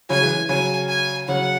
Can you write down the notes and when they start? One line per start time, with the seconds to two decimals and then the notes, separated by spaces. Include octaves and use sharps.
0.09 C#3 F#3 G#5
0.22 E3 G#3
0.49 C#3 F#3 G#5
0.89 G#5
1.28 C#3 F#3 F#5